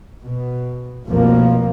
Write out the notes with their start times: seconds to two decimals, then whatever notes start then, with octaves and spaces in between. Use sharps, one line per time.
0.23 B2
1.08 F1 C2 F2 B2 F3 A#3